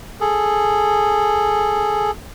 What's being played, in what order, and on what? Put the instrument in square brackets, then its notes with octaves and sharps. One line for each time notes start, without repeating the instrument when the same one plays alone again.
[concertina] G#4 A4